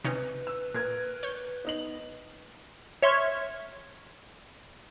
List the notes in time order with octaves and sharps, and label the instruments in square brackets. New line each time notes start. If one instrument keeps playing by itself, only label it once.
[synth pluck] C3 C#4 D#4 [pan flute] B4
[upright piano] E6
[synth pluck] A#2 [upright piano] A#4 G#6
[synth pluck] C#5 G6
[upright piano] B3 D#4 F#7
[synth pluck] C#5 E5 C6 C#6 F6 G#6